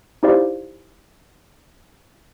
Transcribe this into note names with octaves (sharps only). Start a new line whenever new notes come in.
D#4 E4 G4 C5 D5 F5